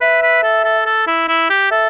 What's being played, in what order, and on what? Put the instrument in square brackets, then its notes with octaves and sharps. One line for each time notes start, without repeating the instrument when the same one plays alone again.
[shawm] B4 [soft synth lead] E5
[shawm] B4
A4
A4
A4
E4
E4
G4
[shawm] A4 [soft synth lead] E5